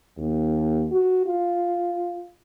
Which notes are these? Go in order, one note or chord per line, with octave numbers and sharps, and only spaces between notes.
D#2
F#4
F4